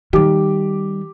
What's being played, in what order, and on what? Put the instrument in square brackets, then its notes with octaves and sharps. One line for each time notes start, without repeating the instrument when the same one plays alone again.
[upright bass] D#3 G3 [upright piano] G4 D6